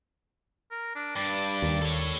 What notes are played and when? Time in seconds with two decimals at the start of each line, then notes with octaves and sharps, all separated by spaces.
0.71 A#4
0.95 D4
1.16 G2 D5
1.62 D#2
1.82 A4 C#5